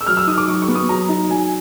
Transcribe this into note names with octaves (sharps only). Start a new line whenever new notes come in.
E6
F#3 F6
E6
D#4 D#6
D6
F#3 C#6
C#6
B3
D#6
F#3 A#5
D#4
F#3 G#5